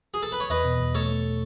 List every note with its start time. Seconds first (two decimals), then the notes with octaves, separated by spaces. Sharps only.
0.14 G#4
0.22 A4
0.32 B4
0.40 C#5
0.50 E2 B4 D#5
0.64 B2
0.79 E2
0.95 A3 A4 C#5
1.09 A3